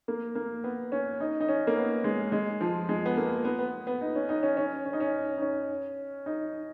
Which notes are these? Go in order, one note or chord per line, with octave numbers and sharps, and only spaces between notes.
A#3
A#3
B3
C#4
D#4
D#4
C#4
A#3
B3
G#3
G#3
F3
G#3
B3
A#3
B3
B3
B3
D#4
C#4
D#4
C#4
C#4
C#4
D#4
C#4
D#4
C#4
D#4